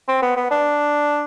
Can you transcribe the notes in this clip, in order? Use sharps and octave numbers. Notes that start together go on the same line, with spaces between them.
C4
B3
B3
D4